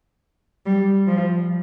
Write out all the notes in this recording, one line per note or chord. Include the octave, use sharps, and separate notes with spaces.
G3
F3